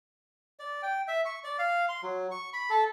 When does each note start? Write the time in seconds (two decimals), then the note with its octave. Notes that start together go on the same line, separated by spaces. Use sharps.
0.59 D5
0.83 G5
1.08 E5
1.25 C#6
1.44 D5
1.59 F5
1.89 C6
2.03 F#3
2.31 C#6
2.53 B5
2.70 A4